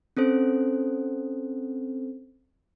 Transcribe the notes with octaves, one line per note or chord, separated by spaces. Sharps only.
C4 C#4 A4 C5